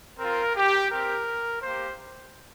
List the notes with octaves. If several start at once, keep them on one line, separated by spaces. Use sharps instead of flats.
C4 F4 A#4
G4
C4 G4 A#4
A#3 G4 C5